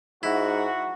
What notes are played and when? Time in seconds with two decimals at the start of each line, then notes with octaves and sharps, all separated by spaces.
0.23 G#2 E4 F#4